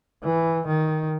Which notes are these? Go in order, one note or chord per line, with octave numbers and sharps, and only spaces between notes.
E3
D#3